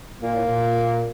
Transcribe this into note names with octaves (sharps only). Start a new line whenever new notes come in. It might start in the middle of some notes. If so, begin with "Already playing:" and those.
A#2 A#3
A2
A#2